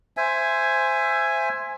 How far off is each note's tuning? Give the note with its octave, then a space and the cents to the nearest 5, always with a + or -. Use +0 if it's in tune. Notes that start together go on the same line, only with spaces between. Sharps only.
C5 +0 E5 +15 G#5 +0